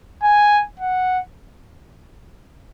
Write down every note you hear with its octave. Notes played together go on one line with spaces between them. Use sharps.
G#5
F#5